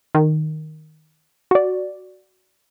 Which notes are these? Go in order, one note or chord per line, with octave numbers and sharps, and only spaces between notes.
D#3
F#4 D5